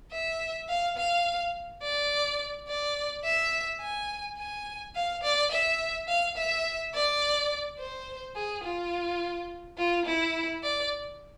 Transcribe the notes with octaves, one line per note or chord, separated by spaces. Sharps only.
E5
F5
F5
D5
D5
E5
G#5
G#5
F5
D5
E5
F5
E5
D5
C5
G#4
F4
F4
E4
D5